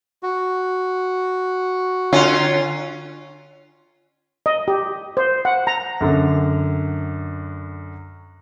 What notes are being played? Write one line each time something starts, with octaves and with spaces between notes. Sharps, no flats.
F#4
D3 C#4 F4
D#5
G4
C5
F#5
A#5
F#2 D3